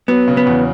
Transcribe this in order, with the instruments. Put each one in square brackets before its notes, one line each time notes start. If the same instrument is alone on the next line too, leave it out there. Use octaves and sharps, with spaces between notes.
[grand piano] F#3 [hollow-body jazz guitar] B3
[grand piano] C#3
[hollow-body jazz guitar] B3
[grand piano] E2